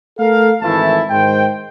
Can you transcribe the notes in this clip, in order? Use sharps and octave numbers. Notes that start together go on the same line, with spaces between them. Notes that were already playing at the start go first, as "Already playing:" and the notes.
A3 A4 A#4 F5
G#1 E3 A3 E4 A4 A5
G#2 D#3 C5 G5